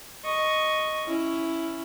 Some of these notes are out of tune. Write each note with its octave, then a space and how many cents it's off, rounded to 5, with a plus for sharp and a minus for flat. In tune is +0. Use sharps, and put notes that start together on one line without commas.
D#5 +0 C#6 +0
C#4 +0 E4 +0